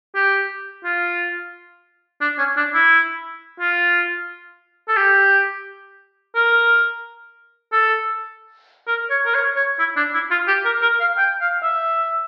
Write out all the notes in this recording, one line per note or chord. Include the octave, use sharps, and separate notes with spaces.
G4
F4
D4
C#4
D4
E4
F4
A4
G4
A#4
A4
A#4
C#5
A#4
C#5
C#5
E4
D4
E4
F4
G4
A#4
A#4
F5
G5
F5
E5